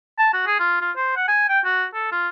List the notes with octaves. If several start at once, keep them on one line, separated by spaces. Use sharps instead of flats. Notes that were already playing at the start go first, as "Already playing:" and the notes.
A5
F#4
G#4
F4
F4
C5
F#5
G#5
G5
F#4
A4
F4